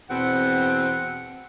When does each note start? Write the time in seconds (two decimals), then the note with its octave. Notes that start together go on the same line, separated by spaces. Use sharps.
0.10 E2 B2 C4 F#5